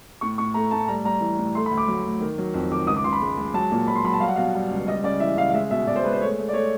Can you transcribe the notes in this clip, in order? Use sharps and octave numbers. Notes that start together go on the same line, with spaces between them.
A2 C#6
A2 C#6
A3 A#5
A2 A5
G3 A#5
G3 A#5
E3
A2
A3 C6
B5
D2
D6
F#3
D2
D#3
F#3
F2
D#3 D6
C#2 D#6
D6
C#2 C6
B5
G#3
G#3
F#3 A5
A#2
A#2 B5
C6
F#3 B5
A5
G3 F5
F#5
B2 F5
G3
C#2
G3 D#5
C#3 D5
E3 E5
C#3 F5
F5
G#3 E5
B2 E5
B2 D5
C5
G#3 B4
C5
A3 C#5
A3
D5
A3 C#5